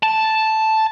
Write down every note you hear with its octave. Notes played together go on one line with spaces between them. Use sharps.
A5